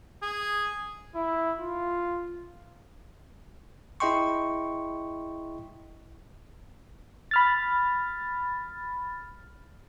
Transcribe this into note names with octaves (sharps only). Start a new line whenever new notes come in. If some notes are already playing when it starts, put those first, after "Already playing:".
G#4
E4
F4
E4 G#4 D#5 G5 C6 C#6
B5 F6 A6